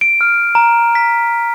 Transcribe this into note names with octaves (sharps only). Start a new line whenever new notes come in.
D7
F6
A#5
B6